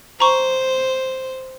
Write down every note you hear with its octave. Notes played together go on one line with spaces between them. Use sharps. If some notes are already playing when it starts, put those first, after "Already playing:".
C5 A#5 C#6